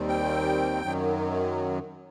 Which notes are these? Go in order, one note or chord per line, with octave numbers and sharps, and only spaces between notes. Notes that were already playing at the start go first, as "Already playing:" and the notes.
Already playing: D#2 D#3 G3 C4
G5
F#2 D#3 F#3